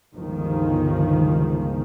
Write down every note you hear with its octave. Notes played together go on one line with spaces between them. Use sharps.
G1 C#2 D#3 F3